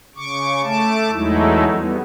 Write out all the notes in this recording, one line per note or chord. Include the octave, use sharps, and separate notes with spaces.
C#3 C#6 D6
A3 A5 D6
E2 F#3 G#3 A3 D#4 E4
G3 B3